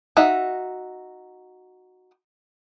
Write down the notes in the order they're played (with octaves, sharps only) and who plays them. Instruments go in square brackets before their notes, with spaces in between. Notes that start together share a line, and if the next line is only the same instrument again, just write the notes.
[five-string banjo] D#4 F#4 E5